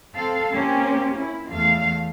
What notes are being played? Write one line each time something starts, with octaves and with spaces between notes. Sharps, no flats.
C4 A4 F5
A#3 C4 C#4 G4
E4
E2 A3 F5